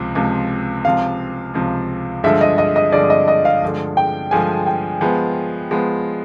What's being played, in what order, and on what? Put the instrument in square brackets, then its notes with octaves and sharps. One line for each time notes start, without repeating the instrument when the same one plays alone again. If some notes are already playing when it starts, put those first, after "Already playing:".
Already playing: [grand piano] C#2 C3 F3
C#2 C3 F3
[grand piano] C#2 C3 F3 [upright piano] F5
[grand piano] C#2 C3 F3
[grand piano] G2 D3 F3 G#3 [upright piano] E5
[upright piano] D#5
D#5
D#5
[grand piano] G2 D3 F3 G#3 [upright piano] D5
[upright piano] D#5
D#5
F5
[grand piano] G2 D3 F3 G#3
[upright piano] G5
[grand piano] G2 D3 F3 G#3 [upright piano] G#5
[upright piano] G5
[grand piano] F3 G#3 B3
F3 G#3 B3